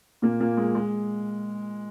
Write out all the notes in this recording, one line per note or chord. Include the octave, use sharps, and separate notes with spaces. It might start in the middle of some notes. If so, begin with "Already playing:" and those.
A#2 A#3
A#2 A#3
G#3
G#3